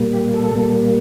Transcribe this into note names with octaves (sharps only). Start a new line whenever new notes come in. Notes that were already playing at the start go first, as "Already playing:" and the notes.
Already playing: A#2 G3 A#3
G4
A4
A#2 G3 A#3